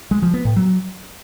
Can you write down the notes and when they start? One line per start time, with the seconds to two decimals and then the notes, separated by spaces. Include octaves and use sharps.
0.11 G#3
0.22 F3
0.34 B3
0.45 A2
0.56 F#3